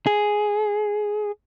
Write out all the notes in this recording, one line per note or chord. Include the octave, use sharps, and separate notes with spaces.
G#4